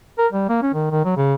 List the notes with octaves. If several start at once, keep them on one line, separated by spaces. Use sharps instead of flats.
A#4
G3
A#3
C#4
D#3
D#3
F#3
C#3